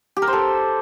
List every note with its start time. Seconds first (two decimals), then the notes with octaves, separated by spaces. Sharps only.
0.17 G4
0.22 A#4
0.27 C5
0.33 A4